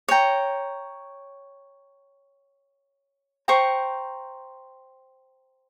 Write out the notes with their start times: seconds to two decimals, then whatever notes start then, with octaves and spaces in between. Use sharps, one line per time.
0.08 C#5 G5 A#5
3.48 C5 G5 A#5 C#6